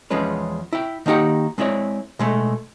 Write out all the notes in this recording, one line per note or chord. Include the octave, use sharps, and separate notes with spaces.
E2 F3 G#3 C#4 B4
E4 G5
D#3 A#3 D#4 G4 F#5
G#3 C4 E4 C#5 D5
B2 G#3 A3